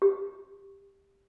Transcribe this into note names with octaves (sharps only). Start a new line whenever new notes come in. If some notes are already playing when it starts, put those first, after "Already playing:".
G4